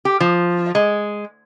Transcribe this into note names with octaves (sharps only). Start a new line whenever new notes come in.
G4
F3
G#3